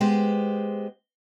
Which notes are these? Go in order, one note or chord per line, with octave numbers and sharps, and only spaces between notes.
G#3 B3 G4 C5